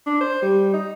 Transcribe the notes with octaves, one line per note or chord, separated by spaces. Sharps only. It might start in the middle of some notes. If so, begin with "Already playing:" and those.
D4
C5
G3
D#4